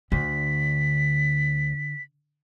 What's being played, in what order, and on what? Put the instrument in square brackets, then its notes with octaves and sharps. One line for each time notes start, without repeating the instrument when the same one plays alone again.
[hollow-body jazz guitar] D2 [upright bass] D3 [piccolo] B6